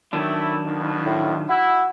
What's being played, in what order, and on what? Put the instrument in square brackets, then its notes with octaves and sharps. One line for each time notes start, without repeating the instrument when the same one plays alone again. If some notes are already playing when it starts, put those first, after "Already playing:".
[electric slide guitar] D#3 F#3 D4 [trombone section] A3 E4
[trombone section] F2 B2
[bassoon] A2
[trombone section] E4 [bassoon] F#4